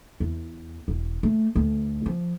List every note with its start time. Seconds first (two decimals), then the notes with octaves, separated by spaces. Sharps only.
0.20 E2
0.88 E1
1.23 A3
1.56 D2 A3
2.06 F3